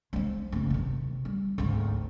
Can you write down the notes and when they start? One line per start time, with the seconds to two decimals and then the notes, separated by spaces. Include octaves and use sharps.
0.13 G#3 C4
0.52 F#1 D3
0.70 C3 D#3
1.25 G3
1.58 G#1 D2